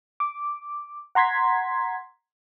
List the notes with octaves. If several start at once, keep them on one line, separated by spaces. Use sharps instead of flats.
D6
F#5 A#5 C6 G#6 B6